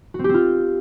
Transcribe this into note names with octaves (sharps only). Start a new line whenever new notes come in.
F#4
C4
G4
C4
F4